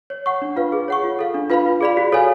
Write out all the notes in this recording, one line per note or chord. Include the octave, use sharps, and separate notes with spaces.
C#5
F#5 C#6
D4
F4 B4 F5
G#4
C#5 F#5 C#6
F4
A4 F5
D4
F4 B4 F5 B5
F4
G#4 D5 F5 B5
F#4
A4 C#5 F5 G#5